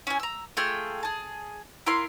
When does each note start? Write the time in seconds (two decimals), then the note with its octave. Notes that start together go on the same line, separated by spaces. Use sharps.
0.07 C#4 E4 G#5
0.20 A#5 E6
0.57 A3 F4 G#4 G5
1.03 G#4 A5
1.87 E4 F4 A#4 C6